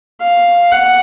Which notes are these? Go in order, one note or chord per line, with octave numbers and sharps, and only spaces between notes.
F5
F#5